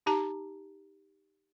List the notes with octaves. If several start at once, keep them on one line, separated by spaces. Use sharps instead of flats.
D#4 G4 A5 A#5